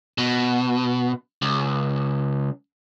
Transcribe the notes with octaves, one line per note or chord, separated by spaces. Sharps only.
B2
C#2